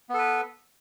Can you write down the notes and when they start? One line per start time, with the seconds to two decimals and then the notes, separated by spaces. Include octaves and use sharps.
0.09 B3
0.14 A4
0.19 B4